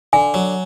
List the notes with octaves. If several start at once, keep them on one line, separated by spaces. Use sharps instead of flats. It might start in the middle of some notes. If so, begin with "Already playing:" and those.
D3 G#5
F#3